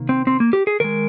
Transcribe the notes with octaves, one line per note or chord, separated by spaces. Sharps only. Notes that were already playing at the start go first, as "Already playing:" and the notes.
Already playing: C3 D#3 A#3
C4
C4
A#3
G4
G#4
D#3 G#3 A#4